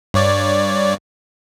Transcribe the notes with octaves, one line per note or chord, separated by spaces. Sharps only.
G2 C#5 D5